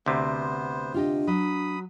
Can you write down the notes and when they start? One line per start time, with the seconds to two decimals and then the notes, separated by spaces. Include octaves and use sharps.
0.06 D2 C3 B3 C5
0.94 D4 F4 G4 D#5
1.27 F#3 B5 D#6